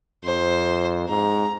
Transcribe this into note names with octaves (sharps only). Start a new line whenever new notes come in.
F2 C5
G#2 A#5